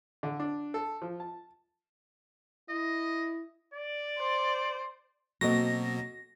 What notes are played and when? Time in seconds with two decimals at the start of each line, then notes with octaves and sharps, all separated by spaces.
0.23 D3
0.40 D4
0.74 A4
1.02 F3
1.20 A5
2.69 E4 D#5
3.74 D5
4.19 C5
5.41 B2 F#3 A#3 C4 F#4 A4 D#5 A#6